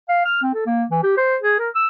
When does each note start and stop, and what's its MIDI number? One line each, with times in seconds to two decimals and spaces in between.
0.09 0.25 77
0.25 0.41 89
0.42 0.50 60
0.54 0.65 69
0.66 0.84 58
0.91 1.01 52
1.03 1.16 67
1.17 1.37 72
1.42 1.57 68
1.59 1.69 70
1.75 1.87 88